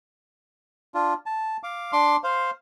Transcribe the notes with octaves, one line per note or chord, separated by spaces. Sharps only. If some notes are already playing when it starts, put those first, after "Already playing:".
D4 F4
A5
F5 D6
D4 C6 D6
C5 F5